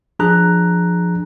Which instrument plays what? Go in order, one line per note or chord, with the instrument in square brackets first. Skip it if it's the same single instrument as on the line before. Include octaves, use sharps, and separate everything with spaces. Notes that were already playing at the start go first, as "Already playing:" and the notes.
[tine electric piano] F3 D4 G#4 A#5 F#6